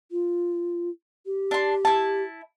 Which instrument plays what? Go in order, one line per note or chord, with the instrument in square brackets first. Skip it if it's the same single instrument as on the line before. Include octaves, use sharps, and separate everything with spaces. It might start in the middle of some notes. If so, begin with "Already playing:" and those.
[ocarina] F4
G4
[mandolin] D4 C6
E4 A5